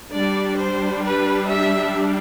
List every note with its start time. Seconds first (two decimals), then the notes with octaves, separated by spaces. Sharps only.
0.13 G3 D4 D5
0.60 C5
1.06 B4
1.50 E5